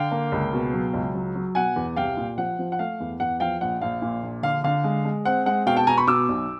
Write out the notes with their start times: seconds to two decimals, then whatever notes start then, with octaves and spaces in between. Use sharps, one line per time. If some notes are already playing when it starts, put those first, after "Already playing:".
Already playing: D3 F5 G5
0.12 A#3
0.32 C#2
0.53 B2
0.73 F#3
0.94 C#2
1.15 F#3
1.35 F#3
1.55 B2 F#5 G#5
1.76 E2
1.96 C2 F5 G5
2.17 A#2
2.38 F3 F#5
2.59 F3
2.72 F#5
2.79 A3 F5
3.00 E2
3.20 E2 F#5
3.40 F3 F5 G5
3.61 A#1 F#5
3.82 A#1 F5
4.02 A#2
4.23 A#1
4.43 D3 F5
4.64 D3 F5
4.84 G#3
5.05 G#3
5.25 C4 F#5
5.46 G#3 F#5
5.66 B2 F5 G5
5.77 G5 A5
5.87 B2 G#5 A#5
5.97 B5 C#6
6.07 B2 D6 E6
6.29 B1